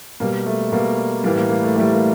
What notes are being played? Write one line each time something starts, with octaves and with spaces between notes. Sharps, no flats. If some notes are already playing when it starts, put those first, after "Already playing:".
B2 G3 A#3
A3
B2 G3 A#3
A2 E3 G3 A#3
A#3
A#3
A3
A2 E3 G3 A#3
A#3